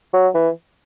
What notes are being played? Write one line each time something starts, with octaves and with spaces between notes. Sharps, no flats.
F#3
E3